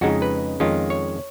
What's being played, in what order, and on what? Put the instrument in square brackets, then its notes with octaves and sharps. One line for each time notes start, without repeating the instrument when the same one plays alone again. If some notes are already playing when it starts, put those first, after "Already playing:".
[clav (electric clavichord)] F2 C#3 G#3 D#4 F#4
B4
F2 D#3 G#3 C#4 F4
C#5